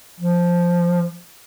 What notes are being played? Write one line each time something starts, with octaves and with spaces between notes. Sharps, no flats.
F3